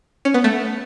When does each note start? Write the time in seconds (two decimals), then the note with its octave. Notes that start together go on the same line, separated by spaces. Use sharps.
0.25 C#4
0.34 B3
0.44 A3